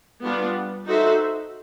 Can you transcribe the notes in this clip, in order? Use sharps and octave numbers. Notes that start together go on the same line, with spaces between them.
G3 B3 D4 F4
D#4 F#4 A4 C5 E5